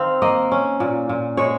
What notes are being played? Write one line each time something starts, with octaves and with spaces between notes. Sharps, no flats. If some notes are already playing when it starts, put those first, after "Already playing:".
Already playing: D#3 C4 F5
A#3 D#5
C#4
A#2
A#2
G#3 C#5